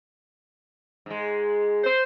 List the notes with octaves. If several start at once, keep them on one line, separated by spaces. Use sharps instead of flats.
G#2 G#3
C5